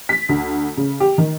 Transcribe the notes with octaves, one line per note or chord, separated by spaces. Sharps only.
B6
D2
C#3
G4
D#3